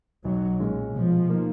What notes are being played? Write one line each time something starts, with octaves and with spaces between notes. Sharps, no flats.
B1 F#3
A#2 G#3 C#4
B2 F3
A#3 D#4